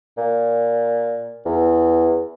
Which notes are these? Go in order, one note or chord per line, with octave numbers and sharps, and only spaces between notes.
A#2
E2